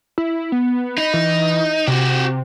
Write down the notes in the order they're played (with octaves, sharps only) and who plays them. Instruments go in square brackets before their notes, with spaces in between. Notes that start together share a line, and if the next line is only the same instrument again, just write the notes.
[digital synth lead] E4
B3
[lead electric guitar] D#4 [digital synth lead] B5
[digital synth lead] E3
[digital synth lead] C3 [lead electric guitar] F#4 G4